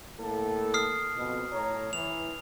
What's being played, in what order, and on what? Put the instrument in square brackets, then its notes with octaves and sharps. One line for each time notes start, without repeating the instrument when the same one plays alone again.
[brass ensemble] A2 A#3 A4
[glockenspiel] D#6 F6 C7
[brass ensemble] F2 B2
A2 C#5 A#5
[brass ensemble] E3 [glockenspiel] F7